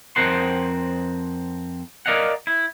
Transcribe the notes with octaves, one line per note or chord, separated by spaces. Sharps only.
F2 C4 A#4 C5 F#5 C6
A#4 D5 D#5 F5 F#5
E4